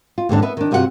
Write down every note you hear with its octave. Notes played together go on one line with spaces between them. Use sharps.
F4
D#2 G#2 D3 D4
B3 B4 E5
D#3 D4
G2 C3 F4 F#4 A#4 F#5